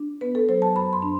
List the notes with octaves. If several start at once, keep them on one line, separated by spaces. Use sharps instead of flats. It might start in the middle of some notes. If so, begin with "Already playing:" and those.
Already playing: D4
B3 B4
A4
F#3 C5
A5
F#2 B5
C6
D4